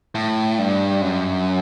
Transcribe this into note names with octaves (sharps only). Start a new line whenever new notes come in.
A2
G2
F#2